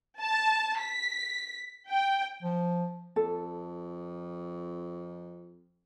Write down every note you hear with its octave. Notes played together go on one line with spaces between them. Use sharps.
A5
B6
G5
F3
F2 A4